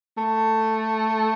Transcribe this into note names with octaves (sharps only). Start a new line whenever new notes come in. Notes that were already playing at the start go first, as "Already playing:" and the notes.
A3